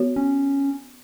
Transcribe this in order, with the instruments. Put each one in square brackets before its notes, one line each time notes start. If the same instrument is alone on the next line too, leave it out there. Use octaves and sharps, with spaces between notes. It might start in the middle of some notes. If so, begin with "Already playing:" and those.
Already playing: [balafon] B3 F#4 C#5
[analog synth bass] C#4